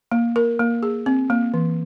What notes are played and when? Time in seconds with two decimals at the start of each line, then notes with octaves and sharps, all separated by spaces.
0.12 A#3
0.36 A#4
0.59 A#3
0.83 G#4
1.06 C4
1.30 A#3
1.54 E3